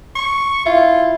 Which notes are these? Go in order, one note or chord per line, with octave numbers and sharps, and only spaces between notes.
C#6
E4 F4